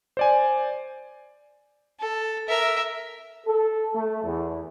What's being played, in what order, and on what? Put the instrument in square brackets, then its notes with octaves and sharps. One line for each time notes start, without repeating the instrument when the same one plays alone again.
[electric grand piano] C5 D5 G#5
[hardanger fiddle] A4
A#4 E5
[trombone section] A4
A3
E2